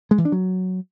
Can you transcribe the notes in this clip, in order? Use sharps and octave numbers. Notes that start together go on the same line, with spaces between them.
G#3
E3
D4
F#3